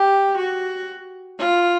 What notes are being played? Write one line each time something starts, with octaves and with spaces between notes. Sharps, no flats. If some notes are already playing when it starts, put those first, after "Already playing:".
Already playing: G4
F#4
F4